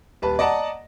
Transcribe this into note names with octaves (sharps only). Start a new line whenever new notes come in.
D#1 B4 A5
D5 D#5 F#5 A5 A#5